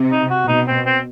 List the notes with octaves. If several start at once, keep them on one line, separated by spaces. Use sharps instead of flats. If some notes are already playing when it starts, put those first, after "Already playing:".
Already playing: C3
D#4
F#4
B2 D#4
C4
C4